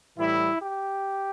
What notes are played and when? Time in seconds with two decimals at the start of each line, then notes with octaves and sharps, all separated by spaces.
0.18 A2 E3 G3 E4
0.61 G4